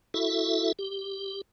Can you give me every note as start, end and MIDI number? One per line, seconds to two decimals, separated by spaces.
0.14 0.72 64
0.14 0.72 66
0.14 0.72 69
0.14 0.72 76
0.79 1.42 67